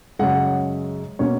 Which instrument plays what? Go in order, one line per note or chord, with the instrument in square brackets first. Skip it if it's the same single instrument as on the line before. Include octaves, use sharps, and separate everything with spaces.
[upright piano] F#2 C#3 G#3 F#5
B2 A#3 C#4 C#5